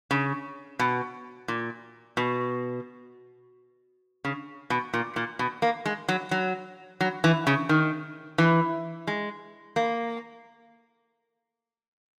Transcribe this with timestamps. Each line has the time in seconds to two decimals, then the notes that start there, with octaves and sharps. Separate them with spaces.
0.11 C#3
0.79 B2
1.48 A#2
2.17 B2
4.25 C#3
4.70 B2
4.94 A#2
5.16 A#2
5.39 B2
5.62 A#3
5.86 G#3
6.09 F#3
6.31 F#3
7.01 F#3
7.24 E3
7.47 C#3
7.69 D#3
8.38 E3
9.07 G#3
9.76 A#3